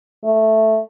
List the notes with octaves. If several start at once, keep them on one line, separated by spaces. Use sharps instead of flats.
A3